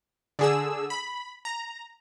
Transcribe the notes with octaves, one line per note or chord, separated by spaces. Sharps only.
D3 G#4 E6
B5
A#5